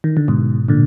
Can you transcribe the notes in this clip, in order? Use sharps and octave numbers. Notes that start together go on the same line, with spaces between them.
D#3
D3
G#2 B2
A#2 D3